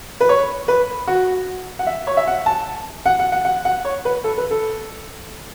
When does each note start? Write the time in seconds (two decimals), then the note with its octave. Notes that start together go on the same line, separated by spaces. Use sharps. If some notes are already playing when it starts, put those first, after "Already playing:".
0.21 B4
0.29 C#5
0.68 B4
1.08 F#4
1.79 F#5
1.87 E5
2.07 C#5
2.17 E5
2.27 F#5
2.46 A5
3.06 F#5
3.20 F#5
3.32 F#5
3.45 F#5
3.65 F#5
3.85 C#5
4.05 B4
4.24 A4
4.38 B4
4.51 A4